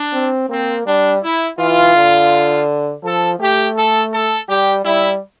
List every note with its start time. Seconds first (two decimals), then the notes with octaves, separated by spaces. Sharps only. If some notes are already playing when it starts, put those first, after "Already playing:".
Already playing: D4
0.13 C4
0.49 A#3 C4
0.86 G3 D4
1.23 E4
1.58 E3 F4
1.95 D3
3.03 F3 A4
3.40 A3 G4
3.76 A4
4.12 A4
4.48 G3 G4
4.85 G3 E4